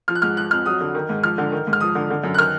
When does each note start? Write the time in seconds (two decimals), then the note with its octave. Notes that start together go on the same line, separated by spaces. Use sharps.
0.08 F3 F6
0.15 F#6
0.22 G#2 F6
0.37 F3 F#6
0.51 F2 F6
0.66 F#3 D#6
0.81 D3
0.95 D#3
1.09 G#2
1.23 F3 F6
1.38 D3
1.52 D#3
1.67 G#2
1.73 F6
1.80 F3 D#6
1.95 D3
2.10 D3
2.24 F#2
2.34 F#6
2.38 D#3 F6